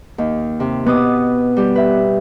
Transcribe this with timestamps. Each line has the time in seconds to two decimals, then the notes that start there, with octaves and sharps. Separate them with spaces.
0.18 D#2
0.60 C3
0.87 B2 B3 D6 D#6
1.57 G3 G4
1.76 B4 E5